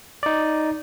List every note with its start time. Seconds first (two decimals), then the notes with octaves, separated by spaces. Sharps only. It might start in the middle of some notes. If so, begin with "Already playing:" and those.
0.23 D#4 D5